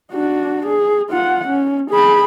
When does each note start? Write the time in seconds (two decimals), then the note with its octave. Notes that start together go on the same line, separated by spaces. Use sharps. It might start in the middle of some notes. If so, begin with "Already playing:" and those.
0.12 D4 F#4
0.66 G#4
1.10 F4 F#5
1.47 C#4
1.90 G#4 B5